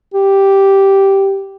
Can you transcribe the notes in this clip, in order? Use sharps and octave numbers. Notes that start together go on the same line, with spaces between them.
G4